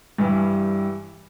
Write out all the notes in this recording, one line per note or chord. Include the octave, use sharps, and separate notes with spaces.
G2 E3 G3